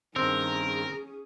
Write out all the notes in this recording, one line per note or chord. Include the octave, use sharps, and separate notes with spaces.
G2 D#3 C4 C#4 G#4 A#4